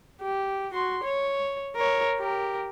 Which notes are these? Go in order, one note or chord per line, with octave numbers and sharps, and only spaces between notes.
G4
F#4 C6
C#5
A#4 C#5
G4 A#4